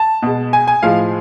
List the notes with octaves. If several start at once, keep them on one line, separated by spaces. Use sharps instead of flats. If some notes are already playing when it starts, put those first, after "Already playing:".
Already playing: A5
B2 G#3
G#5
G#5
A2 F3 G#3 F5